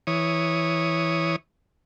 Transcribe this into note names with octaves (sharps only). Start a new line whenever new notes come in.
E3 C#5 D#6